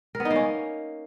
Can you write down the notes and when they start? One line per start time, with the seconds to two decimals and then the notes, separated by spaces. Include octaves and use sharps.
0.15 A#4
0.20 B3
0.25 D#4
0.30 A#3
0.36 C#4